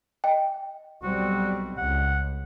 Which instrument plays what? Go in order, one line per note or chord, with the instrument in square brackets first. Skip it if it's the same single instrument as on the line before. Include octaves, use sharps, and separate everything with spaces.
[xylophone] D#5 G5
[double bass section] B1 G3 C4 [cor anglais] F#4
[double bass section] C#2 [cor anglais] F#5